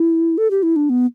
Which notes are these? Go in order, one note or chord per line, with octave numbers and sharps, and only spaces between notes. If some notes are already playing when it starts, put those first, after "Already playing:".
Already playing: E4
A4
G4
E4
D4
B3